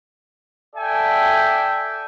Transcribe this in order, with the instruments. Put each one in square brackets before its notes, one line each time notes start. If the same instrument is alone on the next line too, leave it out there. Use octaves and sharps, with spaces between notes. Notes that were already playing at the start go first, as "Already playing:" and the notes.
[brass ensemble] A4 D5 E5 G5 G#5